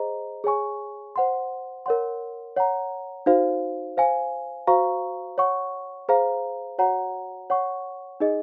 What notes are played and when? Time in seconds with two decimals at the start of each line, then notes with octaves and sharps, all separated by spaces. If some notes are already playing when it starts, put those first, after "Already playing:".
Already playing: G#4 C5 D#5 A#5
0.44 G#4 C#5 G#5 C#6
1.16 C5 F#5 C6
1.86 A#4 C#5 F#5 C6
2.57 C#5 F#5 A#5
3.26 D#4 F#4 C5 F5
3.97 C5 F5 G#5
4.67 F#4 C5 F5 A#5 C#6
5.38 C#5 F#5 C#6
6.09 G#4 C5 F5 A#5
6.78 F#4 C#5 F#5 A#5
7.50 C#5 F#5 C#6
8.20 D#4 G#4 D#5